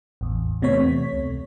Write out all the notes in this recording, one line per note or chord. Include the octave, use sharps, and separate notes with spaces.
A1 E2
E2 C3 A3 B3 C#5 B6
C#2